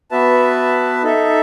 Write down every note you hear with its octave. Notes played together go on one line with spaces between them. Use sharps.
B3 F#4 B4 E5 A5
D#4 A4 E5